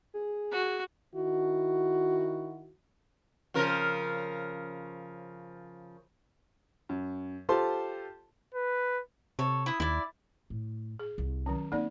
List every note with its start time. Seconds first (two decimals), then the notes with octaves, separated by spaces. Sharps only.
0.14 G#4
0.51 F#4
1.16 D#3 E4 F#4
3.54 C#3 F3 A#4
6.89 F#2
7.49 F4 G4 A4 C5 A5 C6
8.55 B4
9.39 C3 A4 C#5
9.66 E4 D#6
9.80 D#2 E4 D5
10.50 A2
10.99 G#4
11.18 C2
11.46 D#3 F#3 C#4
11.72 A#3 C4 D#4 D5